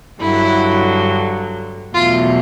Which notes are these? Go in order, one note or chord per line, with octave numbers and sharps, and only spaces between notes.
G2 D3 F#3 E4
E2 B2 F#3 A3 F4